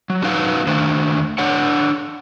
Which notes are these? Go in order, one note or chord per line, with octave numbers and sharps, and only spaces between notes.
F#3
F#3 C#4 D#4 F#4 B4 F5
D#3 A3 D4 C5
D4 A4 C#5 F#5